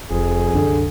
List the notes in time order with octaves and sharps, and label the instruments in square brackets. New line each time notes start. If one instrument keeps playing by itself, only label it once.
[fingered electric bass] F1 [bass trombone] F2 [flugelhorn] G#4
[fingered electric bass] C2 F#2 [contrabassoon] D3